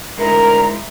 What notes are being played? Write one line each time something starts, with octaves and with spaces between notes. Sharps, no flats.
D2 D3 G#3 D#4 E4 A#4 A#5